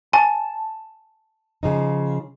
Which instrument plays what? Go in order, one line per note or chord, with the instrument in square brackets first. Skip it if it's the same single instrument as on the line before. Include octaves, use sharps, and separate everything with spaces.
[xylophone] G#5 [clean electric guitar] A5
[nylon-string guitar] C#3 F3 D#4